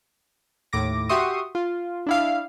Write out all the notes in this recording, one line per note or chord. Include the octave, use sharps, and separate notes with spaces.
D#2 A2 D6 A#6
F#4 G4 E5 C6 C#6 D#6
F4
D4 E4 F5